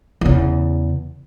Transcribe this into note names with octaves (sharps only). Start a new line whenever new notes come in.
E2 C#3